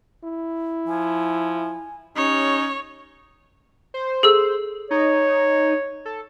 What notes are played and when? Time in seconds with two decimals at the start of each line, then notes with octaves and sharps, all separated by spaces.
0.24 E4
0.88 F3 G#5
2.17 C#4 D#4 G4 C#5
3.94 C5
4.23 G#4 A4 E6
4.91 D#4 C#5
6.05 A4